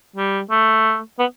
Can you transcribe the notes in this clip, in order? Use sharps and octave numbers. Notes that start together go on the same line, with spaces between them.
G3
A3
B3